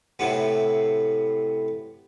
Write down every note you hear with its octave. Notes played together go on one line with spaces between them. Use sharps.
A2 C3 B3